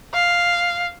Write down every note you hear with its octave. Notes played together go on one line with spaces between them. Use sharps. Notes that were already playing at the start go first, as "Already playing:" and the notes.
F5